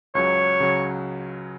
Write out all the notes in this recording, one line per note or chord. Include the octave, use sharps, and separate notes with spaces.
C#2 C#3 F#3 C#5
C#3 F#3